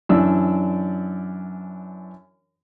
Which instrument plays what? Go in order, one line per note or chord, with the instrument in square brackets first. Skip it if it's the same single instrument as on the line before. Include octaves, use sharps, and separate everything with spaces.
[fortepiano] F#2 E3 D4 D5 E6